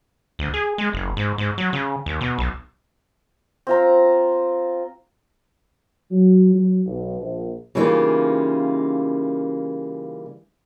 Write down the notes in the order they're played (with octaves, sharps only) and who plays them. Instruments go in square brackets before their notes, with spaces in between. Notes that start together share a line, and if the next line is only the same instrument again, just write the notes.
[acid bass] D2
G#4
G#3
F#1
G#2
G#2
F#3
C#3
D#2
B2
B1
[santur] C4 F4 A#5
[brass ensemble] F#3
F#3
B1
A#1
[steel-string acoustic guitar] C#3 E3 G3 A#3 D#4 F4